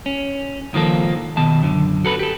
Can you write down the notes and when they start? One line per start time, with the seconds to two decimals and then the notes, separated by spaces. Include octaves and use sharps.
0.06 C#4
0.73 C#2 D#3 F3 A#3 A4
1.37 B2 D#3 A5
1.63 F#2 D3
2.05 F#4 A4 B4
2.19 G4 A4